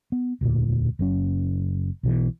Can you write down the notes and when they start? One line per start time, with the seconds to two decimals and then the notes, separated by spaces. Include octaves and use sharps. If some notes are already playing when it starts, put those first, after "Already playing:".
0.12 B3
0.41 E1 D2 A#2
0.99 F#1 F#3 C#4
2.03 B1 B2 E3